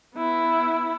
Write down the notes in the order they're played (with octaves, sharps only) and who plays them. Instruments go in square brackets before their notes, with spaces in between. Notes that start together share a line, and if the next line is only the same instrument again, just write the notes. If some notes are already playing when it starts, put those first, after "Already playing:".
[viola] B3 E4